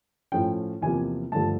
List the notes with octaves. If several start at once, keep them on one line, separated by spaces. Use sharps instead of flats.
A2 F3 A3 C#4 G5
E2 C3 F3 A#3 G#5
G2 D3 F3 A3 A5